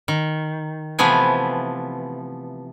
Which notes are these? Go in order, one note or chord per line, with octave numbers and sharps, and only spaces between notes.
D#3
C3 E3 F3 A3 B3 G#5